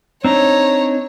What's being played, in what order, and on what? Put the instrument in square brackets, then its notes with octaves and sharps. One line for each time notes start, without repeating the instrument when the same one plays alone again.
[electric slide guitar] C4 D4 D#4 [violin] C#5 [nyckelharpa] A#5